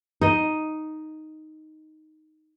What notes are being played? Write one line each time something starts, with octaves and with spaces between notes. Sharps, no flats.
D#4 D#5